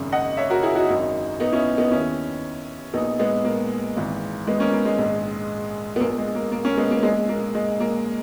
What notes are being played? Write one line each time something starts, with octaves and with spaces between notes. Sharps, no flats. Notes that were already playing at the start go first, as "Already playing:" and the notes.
Already playing: G#1 F#2 C#3
D#5 F#5
C#5 E5
F#4 A#4
E4 G#4
D#4 F#4
G#1 F#2 D#3
B3 D#4
C#4 E4
B3 D#4
D#2 D#3 C#4 E4
A#1 A#2 B3 D#4
G#3 B3
A#3
G#1 G#2 E3
G#3 B3
A#3 C#4
A#3
G#3
A#1 G#2 D#3
B3
A#1 A#2 A#3
G#3
A#3
A#3
A#3 C#4
G#3 B3
A#3
A#1 A#2 G#3
A#3
G#3
A#3